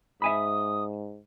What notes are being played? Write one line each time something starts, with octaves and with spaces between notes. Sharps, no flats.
G#2 E5 G#5 B5 D#6